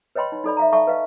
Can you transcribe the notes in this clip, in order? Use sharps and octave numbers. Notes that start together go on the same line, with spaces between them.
B4 C#5 D#5 G5 B5 C6
D#4
D#4 A4 D5 B5
E5 F5 A#5
A4 E5 F5 A5 C#6
B4 D#5 F5